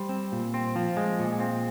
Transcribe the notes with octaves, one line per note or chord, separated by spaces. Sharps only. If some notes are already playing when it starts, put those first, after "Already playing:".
Already playing: G3 C5
C4
A#2
C4
F3
G#3
A#2
C4